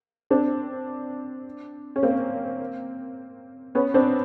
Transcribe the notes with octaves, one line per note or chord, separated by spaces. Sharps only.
C4 D4
C#4
A#3 C4
B3 C#4
C4 D4